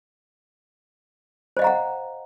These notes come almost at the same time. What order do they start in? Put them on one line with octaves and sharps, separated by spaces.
C5 D#5 F5 A#5 F#5